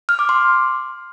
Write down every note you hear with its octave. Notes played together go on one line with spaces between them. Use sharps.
F6
D6
C6